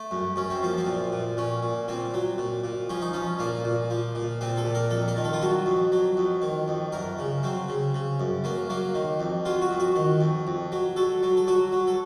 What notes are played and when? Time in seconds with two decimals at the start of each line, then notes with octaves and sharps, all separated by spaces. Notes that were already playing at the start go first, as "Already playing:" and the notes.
Already playing: A3
0.11 F#2
0.36 F#2 C#4
0.50 C4
0.62 F3 A#3
0.78 C4
0.86 A#2
1.12 A#2
1.37 A#2 C#4
1.63 A#2
1.88 A#2 C4
2.14 F#3
2.38 A#2
2.64 A#2
2.90 F3 C#4
3.02 D#4
3.13 F3 C#4
3.39 A#2 A#3
3.64 A#2
3.90 F3
4.15 A#2
4.41 A#2 C4
4.57 A4
4.65 A#2
4.75 A#4
4.90 F2 A4
5.08 A#4
5.17 D#3
5.24 A4
5.33 F4
5.42 F#3 F#4
5.66 F2
5.92 F#3
6.17 F2
6.42 D#3
6.68 F2
6.92 F#2 A#4
7.19 C#3
7.43 F#3 C4
7.68 C#3
7.94 C#3
8.20 F#2
8.44 F#3 A#3
8.70 F#3 A#3
8.95 D#3
9.20 F2
9.45 F#3 F4
9.62 F#4
9.71 F2
9.80 F#4
9.96 D#3
10.21 F2
10.47 F2
10.72 F#3
10.96 F#3 A4
11.23 F#3
11.37 A4
11.47 F#3 F#4
11.72 F#3
11.87 A4